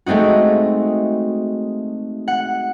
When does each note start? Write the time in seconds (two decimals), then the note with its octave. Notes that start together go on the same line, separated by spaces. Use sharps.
0.06 G#3 A3 C4 D#4 F#4
2.28 F#5